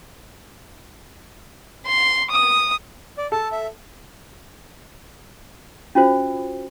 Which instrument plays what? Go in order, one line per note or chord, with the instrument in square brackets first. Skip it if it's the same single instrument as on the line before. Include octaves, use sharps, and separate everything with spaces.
[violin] C6
D#6
[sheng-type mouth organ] D5
[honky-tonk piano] A4 [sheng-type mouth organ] A5
[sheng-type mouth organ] E5
[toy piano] C#4 F4 F#4 C5